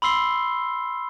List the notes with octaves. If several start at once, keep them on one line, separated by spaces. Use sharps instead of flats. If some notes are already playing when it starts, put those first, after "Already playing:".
B5 C6 E6 C7 G7